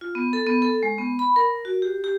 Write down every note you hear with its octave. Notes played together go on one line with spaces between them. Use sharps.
F4
B3
A4
B3
A4
G#3
B3
B5
A#4
F#4
G4
G4